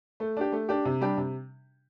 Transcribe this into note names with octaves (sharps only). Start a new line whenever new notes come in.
A3
D4 G4
A3
D4 G4
C3
G3 D4 G4
C3